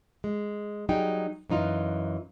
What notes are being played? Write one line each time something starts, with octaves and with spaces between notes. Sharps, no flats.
G#3
F#3 G3 D#4 G#4 G5
F#2 E3 D#4 F4